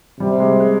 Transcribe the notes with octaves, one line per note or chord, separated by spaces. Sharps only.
C3 G3
G#3
G#3